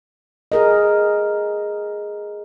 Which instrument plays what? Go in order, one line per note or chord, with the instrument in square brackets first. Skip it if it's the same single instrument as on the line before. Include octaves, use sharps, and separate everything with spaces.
[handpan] G#4 A#4 D#5